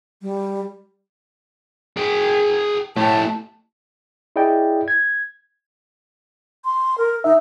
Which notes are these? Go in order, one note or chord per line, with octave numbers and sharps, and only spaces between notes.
G3
G#4 G5
A2 A3 G4 A5
E4 G#4 D5 D#5 G5
G#6
C6
A#4
D#4 E5